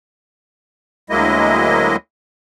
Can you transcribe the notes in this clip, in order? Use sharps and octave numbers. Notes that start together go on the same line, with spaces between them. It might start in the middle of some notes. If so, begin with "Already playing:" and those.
D2 F#3 G#3 A#3 E4 D#5